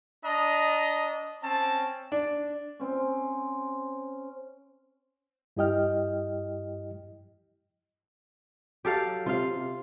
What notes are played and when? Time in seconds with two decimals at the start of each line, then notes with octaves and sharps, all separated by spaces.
0.24 D4 D#5 A#5
1.42 C4 C#4 A5
2.12 D4
2.80 C4 C#4
5.57 G2 E4 G4 D#5 G5 F6
8.85 F#3 G4 A4 F5
9.26 C3 F4 F5
9.55 C3